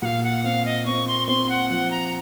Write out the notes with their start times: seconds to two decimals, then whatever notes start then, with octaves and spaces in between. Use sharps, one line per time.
0.02 A#2 F5 F#5
0.23 F#5
0.44 C4 F5
0.65 D#5
0.86 C4 C#6
1.08 C6
1.27 C4 C6
1.49 F#5
1.70 F3 F#5
1.91 A#5